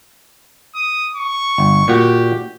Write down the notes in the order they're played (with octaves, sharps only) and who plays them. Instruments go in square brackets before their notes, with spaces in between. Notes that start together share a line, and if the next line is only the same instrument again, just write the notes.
[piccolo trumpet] D#6
C#6
[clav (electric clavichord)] G1
[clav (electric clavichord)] A#2 F#4 [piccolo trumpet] G4